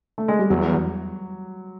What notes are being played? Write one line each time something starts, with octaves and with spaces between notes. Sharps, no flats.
A3
G#3
G3
E2 F#3